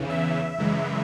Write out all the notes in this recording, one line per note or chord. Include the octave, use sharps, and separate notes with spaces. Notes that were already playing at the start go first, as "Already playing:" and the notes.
Already playing: E2 C#3 E3
E5
F#2 C#3 E3 G#3